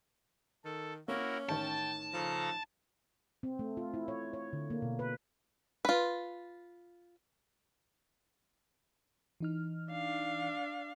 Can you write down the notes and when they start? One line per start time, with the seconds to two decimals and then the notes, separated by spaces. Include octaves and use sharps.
0.64 D#3 A4
1.08 A#3 C#4 E4 F#4 A#4
1.49 A1 D#3 C#5 G5 A5
2.13 C#3 F3 A4 A#5
3.43 C4
3.59 A3
3.77 F4
3.94 E4
4.08 C#5
4.33 C#5
4.53 D3
4.70 A#3
4.82 B2
4.99 B4
5.85 F4 B4
9.40 E3 D#4 F6
9.92 D4 F5